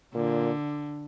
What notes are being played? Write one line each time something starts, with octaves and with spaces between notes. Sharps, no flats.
A#2 D3